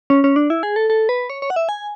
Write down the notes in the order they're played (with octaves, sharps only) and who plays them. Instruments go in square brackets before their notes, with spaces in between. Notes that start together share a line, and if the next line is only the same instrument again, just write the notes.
[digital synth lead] C#4
C#4
D4
E4
G#4
A4
A4
B4
C#5
C#5
F#5
E5
G#5